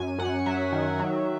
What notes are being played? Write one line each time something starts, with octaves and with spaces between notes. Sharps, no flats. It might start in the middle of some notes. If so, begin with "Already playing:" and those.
Already playing: F#2 G#5
F#2 F#5
F#3 E5
D#3
F#3